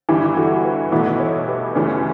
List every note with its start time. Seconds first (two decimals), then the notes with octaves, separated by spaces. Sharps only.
0.09 G1 G2 E3 E4 G4
0.36 F#4 A4
0.64 G4 B4
0.91 B1 A2 E3 B3 E4 F#4 A4
1.19 A4 C#5
1.47 G4 B4
1.75 F#2 C#3 E3 A3 C#4 B4 D5